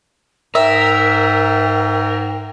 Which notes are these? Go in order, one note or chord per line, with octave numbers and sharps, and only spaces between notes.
G#2 A#4 E5 G5